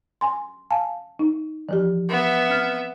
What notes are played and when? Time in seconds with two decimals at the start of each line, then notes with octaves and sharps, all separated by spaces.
0.21 G#5 C6
0.71 F5 G#5 A5
1.19 D#4
1.69 E3 F3 G4
2.09 B3 E5
2.50 C4 F6